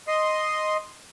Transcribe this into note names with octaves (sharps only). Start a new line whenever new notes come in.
D#5 C6